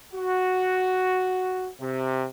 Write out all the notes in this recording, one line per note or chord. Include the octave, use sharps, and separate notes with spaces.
F#4
C3